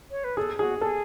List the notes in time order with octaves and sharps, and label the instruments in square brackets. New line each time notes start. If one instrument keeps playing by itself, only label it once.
[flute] C#5
B4
[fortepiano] G#4 [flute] A4
[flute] F#4 [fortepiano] G#4
[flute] G#4 [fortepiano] A4